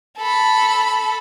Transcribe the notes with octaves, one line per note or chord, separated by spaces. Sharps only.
A4 B5